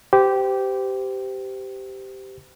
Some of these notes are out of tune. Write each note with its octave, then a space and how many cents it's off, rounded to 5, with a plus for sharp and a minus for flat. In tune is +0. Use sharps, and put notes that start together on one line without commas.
G4 -10 C5 -30